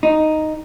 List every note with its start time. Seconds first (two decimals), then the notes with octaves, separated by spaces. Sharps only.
0.03 D#4